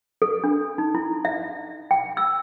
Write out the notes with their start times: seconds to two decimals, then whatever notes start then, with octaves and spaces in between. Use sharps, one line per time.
0.22 A4
0.44 D4
0.78 D#4
0.95 E4
1.25 E5
1.91 G5
2.17 E6